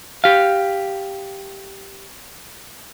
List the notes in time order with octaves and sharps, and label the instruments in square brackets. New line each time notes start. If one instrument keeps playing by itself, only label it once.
[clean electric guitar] G4 F5